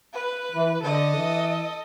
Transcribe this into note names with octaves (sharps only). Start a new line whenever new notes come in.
B4
E3
D3 A4 D#5
E3